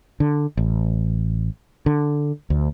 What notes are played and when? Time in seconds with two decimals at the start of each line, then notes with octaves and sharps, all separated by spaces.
0.20 D3
0.57 A1
1.86 D3
2.50 D2